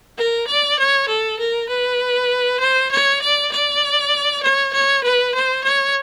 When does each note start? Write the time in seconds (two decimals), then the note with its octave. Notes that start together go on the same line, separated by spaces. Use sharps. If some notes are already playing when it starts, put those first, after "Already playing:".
0.17 A#4
0.47 D5
0.79 C#5
1.08 A4
1.39 A#4
1.69 B4
2.60 C5
2.91 C#5
3.22 D5
3.52 D5
4.43 C#5
4.73 C#5
5.03 B4
5.34 C5
5.64 C#5